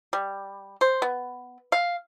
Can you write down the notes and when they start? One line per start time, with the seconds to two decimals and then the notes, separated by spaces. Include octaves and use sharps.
0.13 G3
0.81 C5
1.02 B3
1.72 F5